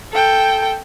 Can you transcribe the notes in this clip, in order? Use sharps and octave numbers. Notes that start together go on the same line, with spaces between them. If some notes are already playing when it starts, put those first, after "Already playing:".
A4 G5